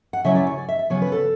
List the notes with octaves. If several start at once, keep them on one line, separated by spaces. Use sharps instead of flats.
F#5
C#3 F#3 C#4 E4 E5
D5
C#5
D5
E5
E5
C#3 F#3 B3 C#5
B4
G#4
A4